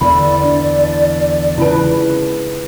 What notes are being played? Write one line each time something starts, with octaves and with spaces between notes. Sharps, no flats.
E2 D3 E3 D5 B5
D4
C#3 E4 F4 B4 A5